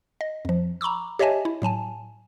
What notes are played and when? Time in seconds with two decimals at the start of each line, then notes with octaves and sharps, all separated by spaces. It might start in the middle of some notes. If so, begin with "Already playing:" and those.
0.21 D#5
0.45 F2 F3
0.81 A#5 B5 C#6 D6 E6
1.19 G4 C#5 D#5 E5 G#5 A5
1.45 E4
1.62 A2 F#3 G#5 A5